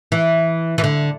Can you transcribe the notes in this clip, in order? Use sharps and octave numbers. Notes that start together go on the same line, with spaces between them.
E3
E3
D3